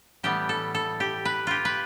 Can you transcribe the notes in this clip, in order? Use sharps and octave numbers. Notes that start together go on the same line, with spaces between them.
A2 E3 G3 B3 G4
A4
A4
G4
B4
F4 G4
B4